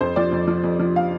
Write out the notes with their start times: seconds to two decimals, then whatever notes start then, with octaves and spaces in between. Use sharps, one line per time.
0.01 F2 C5
0.16 F3 D5
0.32 F2
0.48 F3
0.64 F2
0.80 F3
0.96 F5